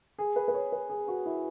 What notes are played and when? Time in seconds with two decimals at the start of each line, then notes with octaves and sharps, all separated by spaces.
0.18 G#4
0.36 B4
0.48 B4
0.54 C#5
0.72 B4
0.89 G#4
1.08 F#4
1.26 E4